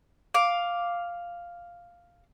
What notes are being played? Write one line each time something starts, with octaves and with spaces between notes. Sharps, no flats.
F5 D6